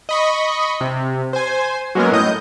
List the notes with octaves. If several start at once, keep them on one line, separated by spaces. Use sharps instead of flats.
D#5 B5 C#6
C3
C5 G#5
F#3 G#3 A#3 B3 C#4 A#4
A2 D#5 G6